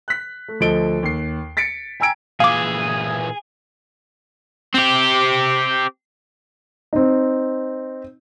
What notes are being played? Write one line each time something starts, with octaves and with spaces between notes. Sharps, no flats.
F#6 B6
A3
D2 F3 A4 D#5 D7 G7
D#2 C7
A6 B6 C#7 D7
G5 G#5 A#5 E6 G#6 D7
A#2 E3 G#4 F5 D6
C4 G4
C4 D#4